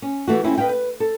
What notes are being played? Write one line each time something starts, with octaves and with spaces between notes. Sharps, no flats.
C#4
E3 A3 F#4
D#2 C4 C#4 E4
B4 D#5 F5 G5
B4
A4